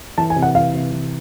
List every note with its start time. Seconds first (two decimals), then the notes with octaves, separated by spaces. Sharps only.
0.18 E3 A5
0.30 G#5
0.36 C3
0.42 F#5
0.55 E3 F5
0.74 C3
0.92 E3